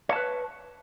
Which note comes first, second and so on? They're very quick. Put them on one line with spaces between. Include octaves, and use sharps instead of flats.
C#5 A5 B4